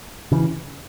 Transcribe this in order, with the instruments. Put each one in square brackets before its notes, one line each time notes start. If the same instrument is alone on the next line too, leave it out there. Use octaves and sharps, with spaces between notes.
[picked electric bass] C#3 E3